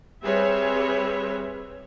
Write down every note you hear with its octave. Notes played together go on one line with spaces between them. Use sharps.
G3 C4 G#4 B4 C#5 E5